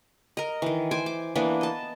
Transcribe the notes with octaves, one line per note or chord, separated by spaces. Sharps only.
A#4 D#5
D#3 E3
C5 G#5 D6
D6
E3 A#3 B3 D4
D#5 A5